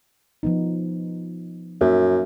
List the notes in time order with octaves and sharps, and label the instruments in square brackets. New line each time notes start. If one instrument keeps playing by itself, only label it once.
[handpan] F3 B3 D#4
[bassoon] F#2 [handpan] A#3 D#4 E5